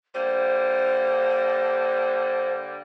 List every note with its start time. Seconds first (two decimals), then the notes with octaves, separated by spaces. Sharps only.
0.14 D3 G3 A#3 C5